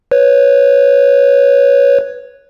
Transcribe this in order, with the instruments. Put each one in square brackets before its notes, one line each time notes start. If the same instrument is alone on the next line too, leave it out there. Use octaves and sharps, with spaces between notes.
[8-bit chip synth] B4 C#5